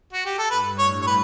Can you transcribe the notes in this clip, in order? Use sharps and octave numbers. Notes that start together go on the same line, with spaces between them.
F#4
G4
A4
G2 B4
A2 C#5
C#5
B4